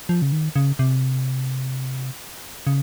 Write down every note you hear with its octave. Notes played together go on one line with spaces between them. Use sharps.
F3
C#3
D#3
C#3
C3
C#3